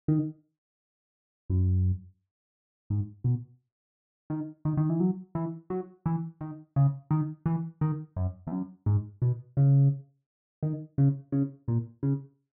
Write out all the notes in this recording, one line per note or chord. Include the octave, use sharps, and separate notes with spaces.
D#3
F#2
G#2
B2
D#3
D#3
D#3
E3
F#3
E3
F#3
E3
D#3
C#3
D#3
E3
D#3
F#2
E2
F#2
G#2
B2
C#3
D#3
C#3
C#3
A#2
C#3